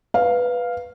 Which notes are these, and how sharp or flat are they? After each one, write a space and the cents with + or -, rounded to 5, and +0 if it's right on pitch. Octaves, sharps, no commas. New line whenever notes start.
B4 +0 F5 +0